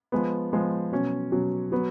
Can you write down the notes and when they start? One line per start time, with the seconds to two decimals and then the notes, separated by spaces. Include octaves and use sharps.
0.12 F3 G#3 B3
0.52 F3 G#3 B3
0.92 B2 F#3 C#4
1.32 B2 F#3 C#4
1.72 F#3 B3 F#4